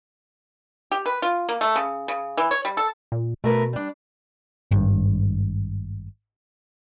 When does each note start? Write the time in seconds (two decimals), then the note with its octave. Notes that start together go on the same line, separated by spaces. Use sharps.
0.92 G4
1.06 B4
1.22 F4
1.49 A#3
1.61 A3
1.76 C#3
2.08 C#3
2.37 E3
2.51 C#5
2.65 G3
2.77 A4
3.12 A#2
3.44 B2 A3 A#4 B4
3.73 G3 D4
4.71 G#1 G2